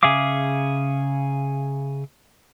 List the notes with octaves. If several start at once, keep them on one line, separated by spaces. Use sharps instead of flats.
C#3 G#4 E5 F5 D6